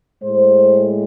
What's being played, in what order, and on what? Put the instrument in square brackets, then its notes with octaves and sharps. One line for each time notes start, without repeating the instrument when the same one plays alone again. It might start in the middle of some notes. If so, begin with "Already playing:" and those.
[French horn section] A2 G#3 C5